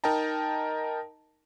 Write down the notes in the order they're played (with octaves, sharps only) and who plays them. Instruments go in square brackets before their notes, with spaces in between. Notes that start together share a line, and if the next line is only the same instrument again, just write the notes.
[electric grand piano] D#4 A#4 D#5 G5 A5 A#5